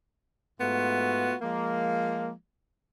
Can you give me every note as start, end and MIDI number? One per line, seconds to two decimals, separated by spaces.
0.61 1.34 44
0.61 1.34 57
0.61 1.34 59
0.61 1.34 65
0.61 1.34 66
1.42 2.32 53
1.42 2.32 56
1.42 2.32 58